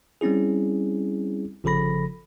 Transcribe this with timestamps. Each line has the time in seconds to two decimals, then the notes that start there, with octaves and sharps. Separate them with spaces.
0.21 G3 C4 C#4 E4 G#4
1.64 G1 C#3 F3 A4 B5 A#6